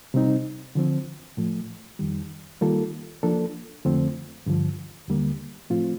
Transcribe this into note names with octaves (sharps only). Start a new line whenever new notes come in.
C3 G3 C4 D#4
D3 F3 C4
A2 F3 A3
F2 D#3 G3
D#3 G3 A#3 F4 A4
F3 A#3 D4 A4
F2 D3 F3 A3 C4
G2 D3 F3
D#2 D3 G3 A#3
A2 F3 A3 C4 F4